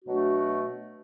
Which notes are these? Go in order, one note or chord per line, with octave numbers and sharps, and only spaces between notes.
B2 F#3 A3 D4 F#4